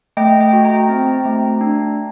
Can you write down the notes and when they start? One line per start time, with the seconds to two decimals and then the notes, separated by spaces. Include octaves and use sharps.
0.17 A3 D#5 G5
0.41 D#5 G5
0.53 F#4
0.65 G5 A#5
0.89 C4
1.25 A3
1.61 D4